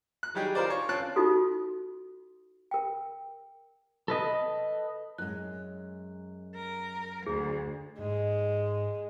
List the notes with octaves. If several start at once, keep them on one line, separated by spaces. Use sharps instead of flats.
F#6
F#3 G3 D#4 G4 G#4
F4 A#4 C5 D5
C#5
C4 C#4 F4 A5 F#6
D#4 F4 F#4 A4
A#4 G5
A4 B4 D#5
F#2 G#3 F#6
A#4
D2 G#4
G#2 G#3